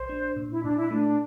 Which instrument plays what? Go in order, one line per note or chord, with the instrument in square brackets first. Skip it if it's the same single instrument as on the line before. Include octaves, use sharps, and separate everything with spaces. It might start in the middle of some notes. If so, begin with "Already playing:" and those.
Already playing: [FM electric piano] A#1 [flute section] C5
[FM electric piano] D4
A#2
[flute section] E4
[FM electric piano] A#2 [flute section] D4
[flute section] E4
[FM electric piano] A3 [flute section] D4